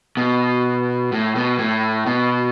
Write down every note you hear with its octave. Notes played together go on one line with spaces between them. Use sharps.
B2
A2
B2
A2
B2